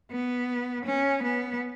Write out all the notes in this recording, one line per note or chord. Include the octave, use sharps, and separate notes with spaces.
B3
C#4
B3